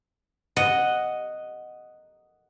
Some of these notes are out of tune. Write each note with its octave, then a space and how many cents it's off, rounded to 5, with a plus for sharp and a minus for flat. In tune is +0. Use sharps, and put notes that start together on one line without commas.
D#5 -5 F#5 +0